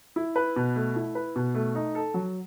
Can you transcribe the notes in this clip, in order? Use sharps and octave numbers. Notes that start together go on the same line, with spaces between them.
E4
B4
B2
A3
E4
B4
B2
A3
D#4
A4
F#3